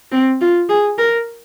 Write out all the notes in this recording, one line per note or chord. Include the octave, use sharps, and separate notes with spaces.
C4
F4
G#4
A#4